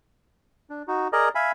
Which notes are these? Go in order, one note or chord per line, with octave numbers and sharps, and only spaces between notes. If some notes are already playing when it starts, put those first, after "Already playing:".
D4
D#4 F#4
G#4 A#4 D5 D#5 A#5
E5 F5 G#5 B5